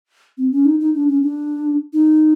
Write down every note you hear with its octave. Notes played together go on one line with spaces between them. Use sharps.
C4
C#4
D#4
D#4
D4
C#4
D4
D#4